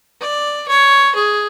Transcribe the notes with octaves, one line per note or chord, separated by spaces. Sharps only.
D5
C#5
G#4